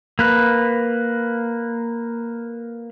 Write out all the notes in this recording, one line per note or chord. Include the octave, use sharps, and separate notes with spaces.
A#3 B4